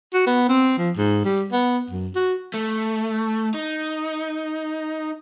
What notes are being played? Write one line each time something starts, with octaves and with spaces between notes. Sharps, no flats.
F#4
B3
C4
F3
G#2
G3
B3
F#2
F#4
A3
D#4